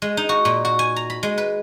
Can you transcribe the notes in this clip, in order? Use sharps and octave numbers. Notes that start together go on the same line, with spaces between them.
G#3
D#4
F#4
A#2
F#4
G#5
A#5
B5
G#3
B4